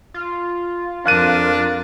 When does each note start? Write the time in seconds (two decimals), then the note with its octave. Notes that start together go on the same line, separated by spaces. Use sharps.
0.14 F4
1.06 F2 D4 A#4 F5 F#6 D#7